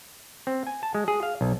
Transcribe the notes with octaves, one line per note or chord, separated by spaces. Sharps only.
C4
G#5
A5
G#3
G#4
F5
B1